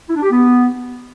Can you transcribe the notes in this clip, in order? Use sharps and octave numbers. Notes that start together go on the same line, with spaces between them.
E4
D4
G4
B3